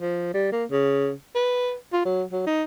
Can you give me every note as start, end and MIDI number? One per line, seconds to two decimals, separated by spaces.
0.01 0.31 53
0.34 0.48 55
0.52 0.64 58
0.71 1.12 49
1.35 1.74 71
1.93 2.04 65
2.05 2.23 54
2.32 2.42 54
2.46 2.64 63